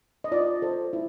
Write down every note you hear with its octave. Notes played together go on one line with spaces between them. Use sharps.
D#5
F4 D5
A4 C5
E4